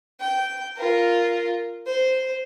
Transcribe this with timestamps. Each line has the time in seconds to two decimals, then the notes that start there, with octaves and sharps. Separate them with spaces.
0.20 G5
0.76 F4 A#4
1.86 C5